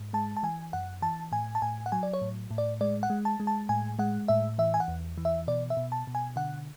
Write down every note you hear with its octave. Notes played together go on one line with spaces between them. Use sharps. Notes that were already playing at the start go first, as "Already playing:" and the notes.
Already playing: G#2
G#3 A5
A5
E3 G#5
F#2 F#5
E3 A5
A2 G#5
A5
A2 G#5
F#5
F#3 G#5
D5
C#5
A2
A2
D5
G#3 D5
F#5
G#3
A5
G#3
A5
A2 G#5
G#3 F#5
A2 E5
E3 E5
G#5
F#5
E2
E3
E5
B2 D5
E5
B2
A5
B2
G#5
D3 F#5